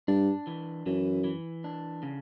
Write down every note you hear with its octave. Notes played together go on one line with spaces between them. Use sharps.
G2 D4
E3
F#2 E3
E3
D4
C#3